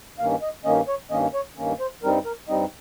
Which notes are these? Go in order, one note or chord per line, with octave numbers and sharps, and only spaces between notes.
G2 D#3 A#3 C#4 F5
D#5
G2 D#3 A#3 C#4 D#5
C#5
G2 D#3 A#3 C#4 D#5
C#5
G2 D#3 A#3 C#4
C5
G2 G3 C4 D#4 A#4
A#4
G2 G3 C4 D#4 D#5